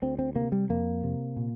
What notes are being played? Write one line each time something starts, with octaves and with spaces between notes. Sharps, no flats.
D2 C4
C4
C3 A#3
G3
F2 A#3
C3
A#2